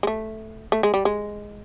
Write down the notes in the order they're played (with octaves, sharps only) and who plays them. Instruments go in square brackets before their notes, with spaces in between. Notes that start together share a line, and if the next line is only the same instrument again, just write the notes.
[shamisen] G#3
A3
A3
G#3
G3
G#3